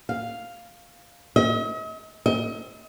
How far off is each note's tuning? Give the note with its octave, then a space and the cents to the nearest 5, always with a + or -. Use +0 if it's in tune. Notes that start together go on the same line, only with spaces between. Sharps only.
F5 +0
D#5 +45
D#5 +40